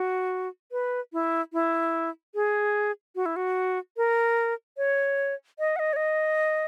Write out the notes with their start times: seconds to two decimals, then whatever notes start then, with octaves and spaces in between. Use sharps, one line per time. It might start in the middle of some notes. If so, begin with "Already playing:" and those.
Already playing: F#4
0.72 B4
1.13 E4
1.53 E4
2.35 G#4
3.15 F#4
3.26 E4
3.36 F#4
3.97 A#4
4.77 C#5
5.59 D#5
5.76 F#5
5.79 D#5
5.93 C#5
5.96 D#5